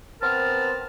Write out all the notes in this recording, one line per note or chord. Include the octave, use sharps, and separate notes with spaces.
B3 C4 A#4 A5 F6